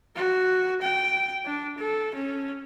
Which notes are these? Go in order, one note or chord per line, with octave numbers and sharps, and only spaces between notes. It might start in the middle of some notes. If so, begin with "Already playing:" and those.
F#4
G5
D4
A4
C#4